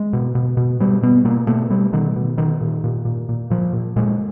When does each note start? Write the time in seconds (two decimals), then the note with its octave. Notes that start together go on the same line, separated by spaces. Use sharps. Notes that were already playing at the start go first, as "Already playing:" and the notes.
Already playing: G#3
0.13 B2
0.35 B2
0.57 B2
0.80 B2 G3
1.02 B2 B3
1.25 B2 A#3
1.47 B2 A3
1.70 B2 G3
1.93 B2 D#3
2.16 B2
2.37 B2 D#3
2.61 A#2
2.84 A#2
3.05 A#2
3.29 A#2
3.50 A#2 F3
3.73 A#2
3.96 A#2 G#3